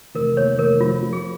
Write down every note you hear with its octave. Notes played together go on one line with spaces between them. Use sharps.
F1 A#4
D#2 C#5
F1 A#4
F3 F4
F3
G#4